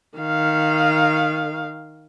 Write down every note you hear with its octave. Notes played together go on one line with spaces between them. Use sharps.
D#3 F5